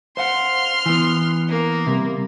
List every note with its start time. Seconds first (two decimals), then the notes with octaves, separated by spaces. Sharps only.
0.17 C5 F5 F#5 C6 F6
0.86 E3 B3
1.49 A#3
1.87 C3 G3